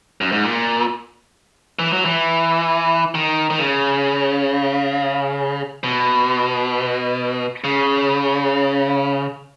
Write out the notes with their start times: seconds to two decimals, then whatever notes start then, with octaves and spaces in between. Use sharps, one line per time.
0.21 F#2
0.32 G#2
0.44 A#2
1.79 E3
1.93 F#3
2.05 E3
3.15 D#3
3.50 D#3
3.59 C#3
5.84 B2
7.64 C#3